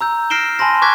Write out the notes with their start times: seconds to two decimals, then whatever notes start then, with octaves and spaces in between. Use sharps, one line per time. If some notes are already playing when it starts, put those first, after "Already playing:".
0.01 A#5 E6 G6
0.30 F6 A#6 C7 D7 E7 G7
0.59 G#5 A5 B5 C6 A#6
0.82 A5 C#6 D6 F#6 G#6 B6